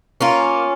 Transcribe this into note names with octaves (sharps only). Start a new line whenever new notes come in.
A#3 C#4 F4